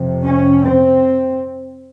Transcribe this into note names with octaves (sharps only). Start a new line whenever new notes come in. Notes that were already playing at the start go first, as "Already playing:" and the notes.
Already playing: F2 C3
C#4
C4